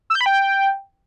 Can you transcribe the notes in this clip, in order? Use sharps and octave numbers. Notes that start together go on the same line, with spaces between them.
E6
G6
B5
G5